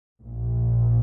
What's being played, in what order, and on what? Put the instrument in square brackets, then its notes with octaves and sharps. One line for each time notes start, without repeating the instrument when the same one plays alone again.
[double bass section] A#1 A#2